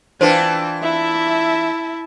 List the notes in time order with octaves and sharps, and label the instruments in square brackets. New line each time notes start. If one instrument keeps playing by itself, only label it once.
[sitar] E3 D4 F4 [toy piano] B4 C5 [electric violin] G5 A5
[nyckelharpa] E4 [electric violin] E5 A5